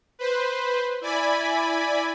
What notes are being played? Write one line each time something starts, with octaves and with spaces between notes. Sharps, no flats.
B4 C5
E4 D5 G#5 B5